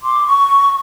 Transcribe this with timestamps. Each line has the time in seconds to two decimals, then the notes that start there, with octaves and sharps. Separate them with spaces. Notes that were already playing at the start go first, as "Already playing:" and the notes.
0.01 C6 D6
0.24 C#6